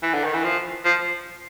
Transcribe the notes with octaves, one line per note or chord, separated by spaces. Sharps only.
E3
D3
D#3
E3
F3
F3